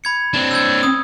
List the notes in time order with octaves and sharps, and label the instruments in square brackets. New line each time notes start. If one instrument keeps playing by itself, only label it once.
[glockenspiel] B5 G#6 C#7
[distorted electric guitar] C4 D4
[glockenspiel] E6 G6 G#6
D#6